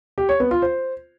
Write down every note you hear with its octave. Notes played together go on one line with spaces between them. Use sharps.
G4
C#5
B3
F4
C5